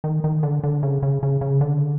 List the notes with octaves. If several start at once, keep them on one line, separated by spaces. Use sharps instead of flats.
D#3
D#3
D3
D3
C#3
C#3
C#3
C#3
D3